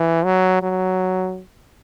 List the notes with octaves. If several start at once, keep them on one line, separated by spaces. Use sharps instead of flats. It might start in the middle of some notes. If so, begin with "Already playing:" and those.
Already playing: E3
F#3
F#3